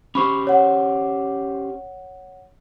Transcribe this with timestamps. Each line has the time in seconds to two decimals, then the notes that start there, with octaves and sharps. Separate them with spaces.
0.15 C#4 G4 C5 B5 C#6
0.47 C#5 F#5